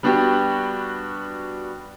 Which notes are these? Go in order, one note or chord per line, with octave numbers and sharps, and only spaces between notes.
G3 B3 D4 F#4 G4